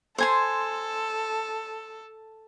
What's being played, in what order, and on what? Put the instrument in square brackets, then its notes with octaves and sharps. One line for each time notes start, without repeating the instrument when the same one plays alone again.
[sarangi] A4 [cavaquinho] C5 G#5 C6